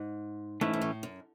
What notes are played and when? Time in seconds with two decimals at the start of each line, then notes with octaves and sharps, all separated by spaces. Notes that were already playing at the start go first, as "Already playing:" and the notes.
Already playing: G#2
0.61 G#2 E3 A3 C#4 E4
0.73 G#2
0.81 A2
1.03 F#2